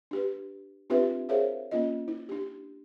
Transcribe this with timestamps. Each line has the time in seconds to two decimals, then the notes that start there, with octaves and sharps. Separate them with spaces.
0.11 D4 G4 B4
0.90 C4 D4 F4 G4 B4 E5
1.29 G#4 A#4 C5 C#5 E5 F5
1.71 A#3 C#4 F4 D#5
2.08 E4
2.29 D4 G4